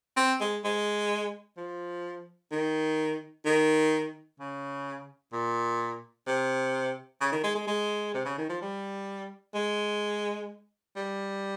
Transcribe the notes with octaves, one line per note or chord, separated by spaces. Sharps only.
C4
G#3
G#3
F3
D#3
D#3
C#3
A#2
C3
C#3
D#3
G#3
G#3
G#3
C3
C#3
D#3
F3
G3
G#3
G3